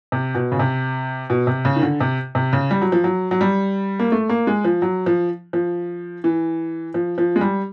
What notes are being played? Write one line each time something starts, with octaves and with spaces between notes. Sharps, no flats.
C3
B2
C#3
C3
B2
C3
C#3
D#3
D3
C3
C3
C#3
G3
F#3
F3
F#3
F#3
G3
A#3
A3
A#3
G#3
F3
F#3
F3
F3
E3
F3
F3
G#3
G3